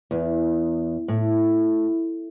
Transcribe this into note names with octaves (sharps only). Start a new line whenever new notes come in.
E2
A2